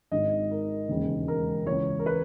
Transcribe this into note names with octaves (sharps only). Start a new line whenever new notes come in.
G#1 G#2 D#3 G#3 D#5
A#4
E1 D#2 C#3 G#3
A#4
C#2 C#3 E3 C#5
A#4
B4